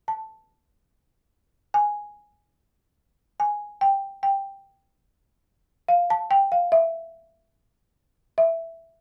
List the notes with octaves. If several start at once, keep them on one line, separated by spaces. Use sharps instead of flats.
A5
G#5
G#5
G5
G5
F5
A5
G5
F5
E5
E5